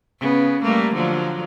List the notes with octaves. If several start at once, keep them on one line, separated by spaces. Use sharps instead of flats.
C#3 B3
G3 A3 A#3
D3 F3 F#3